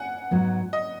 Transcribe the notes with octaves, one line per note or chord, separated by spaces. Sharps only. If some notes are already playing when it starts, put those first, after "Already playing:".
Already playing: F#5 G#5
G#2 F#3 B3
D#5